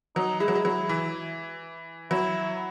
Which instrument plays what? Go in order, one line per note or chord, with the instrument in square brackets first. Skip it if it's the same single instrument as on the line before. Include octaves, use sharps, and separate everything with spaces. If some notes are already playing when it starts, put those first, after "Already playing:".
[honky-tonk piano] F#3 [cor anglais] D#4
[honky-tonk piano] G#3 [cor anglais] E4
[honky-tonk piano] F#3
G#3
[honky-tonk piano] F#3 [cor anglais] E4
[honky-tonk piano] E3
[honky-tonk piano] F#3 [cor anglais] E4